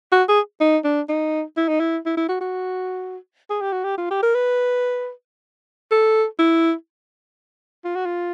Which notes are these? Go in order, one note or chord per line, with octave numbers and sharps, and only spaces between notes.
F#4
G#4
D#4
D4
D#4
E4
D#4
E4
E4
E4
F#4
F#4
G#4
G4
F#4
G4
F4
G4
A#4
B4
A4
E4
F4
F#4
F4